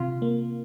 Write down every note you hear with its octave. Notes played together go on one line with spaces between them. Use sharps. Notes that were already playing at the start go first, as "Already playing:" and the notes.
Already playing: C3 F4
A#3